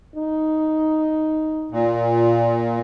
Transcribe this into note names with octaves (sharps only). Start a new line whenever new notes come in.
D#4
A#2